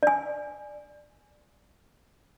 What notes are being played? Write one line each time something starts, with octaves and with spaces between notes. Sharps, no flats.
D5 G#5